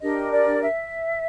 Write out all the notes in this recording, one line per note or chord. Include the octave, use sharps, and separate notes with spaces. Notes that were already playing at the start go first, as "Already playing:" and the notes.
D4 G4 A#4 D#5
D5
E5